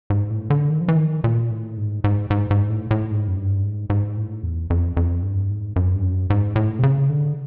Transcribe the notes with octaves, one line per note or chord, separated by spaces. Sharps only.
G#2
A2
D3
D#3
F3
E3
D#3
A#2
A2
G#2
G#2
G#2
G#2
A2
A2
G#2
F#2
G2
G#2
G#2
A2
E2
F2
F2
G2
G#2
F#2
G2
F#2
G#2
A2
C3
C#3
D3